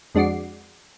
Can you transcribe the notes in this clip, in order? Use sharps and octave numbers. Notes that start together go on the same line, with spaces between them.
F2 G#3 D4 F#4 D6 C7